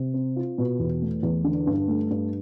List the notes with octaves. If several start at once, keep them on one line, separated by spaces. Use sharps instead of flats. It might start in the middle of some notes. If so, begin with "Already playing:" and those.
Already playing: C3
C4
F4
B2
E2
A3
E2
D3
G2
A3
G2